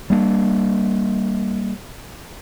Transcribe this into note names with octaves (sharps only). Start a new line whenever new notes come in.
G3 A#3 C4 D4